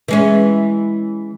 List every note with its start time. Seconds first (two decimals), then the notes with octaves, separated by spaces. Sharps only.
0.08 E3 G#3 C#4